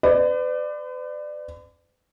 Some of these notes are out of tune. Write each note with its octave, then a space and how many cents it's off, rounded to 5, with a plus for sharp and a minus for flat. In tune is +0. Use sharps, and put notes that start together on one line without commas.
B4 +45 D5 +20